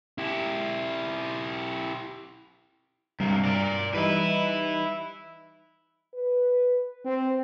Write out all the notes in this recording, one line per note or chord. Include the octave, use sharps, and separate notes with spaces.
E4 G4
G2 C3 A#3
A#4 D5
E3 G3 D#4 E4 B4
B4
C4